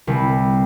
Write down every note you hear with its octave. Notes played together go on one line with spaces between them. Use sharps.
C2 B4